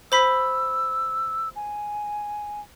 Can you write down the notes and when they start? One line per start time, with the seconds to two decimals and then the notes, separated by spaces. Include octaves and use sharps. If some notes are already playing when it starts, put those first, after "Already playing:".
0.12 C5 B5 E6 B6
1.56 G#5